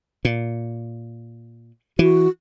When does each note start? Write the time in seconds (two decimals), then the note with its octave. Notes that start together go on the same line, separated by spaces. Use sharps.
0.25 A#2
1.99 E3 F#4